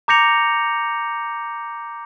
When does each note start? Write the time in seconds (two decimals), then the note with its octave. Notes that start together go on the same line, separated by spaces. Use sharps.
0.08 A#5 D6 G6 A#6 C#7 F7